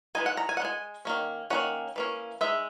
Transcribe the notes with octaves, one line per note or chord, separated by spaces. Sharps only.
E3 G#3 D#4 G#5
F#5
A#5
G#5
F#5
G#3 D#4 G#5
D#3 A#3 C#4
D#3 A#3 C#4 F#5
E3 A#3 C#4
G#3 D#4 E5